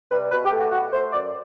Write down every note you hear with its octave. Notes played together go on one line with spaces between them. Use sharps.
C3 G3 B4
B2 B4
G4
A3
F#4
B2 F#4
A3 C5
F#2 D5